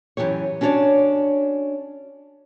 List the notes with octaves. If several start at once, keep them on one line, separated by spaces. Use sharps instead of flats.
F#2 D#3 E3 G4 C#5
C#4 D4 F#4 A#4 C#5 D5